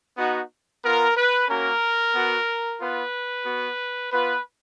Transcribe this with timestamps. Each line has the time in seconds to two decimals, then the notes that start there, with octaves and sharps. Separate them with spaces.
0.17 B3 D#4 F#4
0.84 B3 F4 A#4
1.16 B4
1.48 A#3 C#4 F#4 A#4
2.14 B3 F#4
2.80 B3 F4 B4
3.45 B3 F#4
4.11 B3 F4 B4